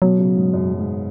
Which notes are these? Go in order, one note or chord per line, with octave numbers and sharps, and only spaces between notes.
B2 F#3
C#3
G#2
F#2
G#2